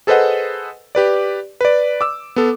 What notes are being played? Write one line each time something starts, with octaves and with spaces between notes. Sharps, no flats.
G#4 A4 B4 C5 D#5 F#5
G4 B4 D5
B4 D5
D6 E6
B3 A4